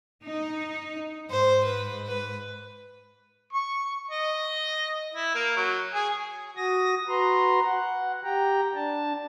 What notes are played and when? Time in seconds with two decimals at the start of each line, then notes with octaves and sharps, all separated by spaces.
0.25 D#4
1.30 G#2 C5
1.65 B4
2.07 B4
3.53 C#6
4.11 D#5
5.14 E4
5.35 A#3
5.56 F#3
5.94 G#4
6.57 F#4 D#6 A#6
7.08 F#4 B4 A#5 C6
7.64 F#5
8.23 G4 G5 A#5
8.75 D4 A5